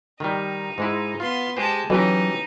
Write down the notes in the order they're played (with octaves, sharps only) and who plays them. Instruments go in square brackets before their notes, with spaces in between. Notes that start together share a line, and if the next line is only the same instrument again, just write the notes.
[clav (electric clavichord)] D#3 G3 [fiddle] D#4
[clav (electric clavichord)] G#2 G#3 E4
[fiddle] B3 C6 [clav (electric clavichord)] F4
[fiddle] G#3 A5 [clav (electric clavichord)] G4 C5
[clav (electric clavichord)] E3 C#4 G4 [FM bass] F#3 [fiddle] D#4